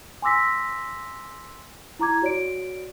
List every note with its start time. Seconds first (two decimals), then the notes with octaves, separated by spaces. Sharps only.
0.22 G#5 C6 D6 E6 A#6 B6
1.99 E4 A#5 D6 G#6
2.22 F#4 C#5 D5 D7